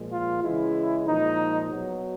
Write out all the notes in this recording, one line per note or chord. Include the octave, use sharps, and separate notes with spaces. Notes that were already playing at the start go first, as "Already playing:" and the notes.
Already playing: A#2 F3 G#3
F4
C#3 E3 G#3 E4
A#2 F3 G#3 D#4
B2 F#3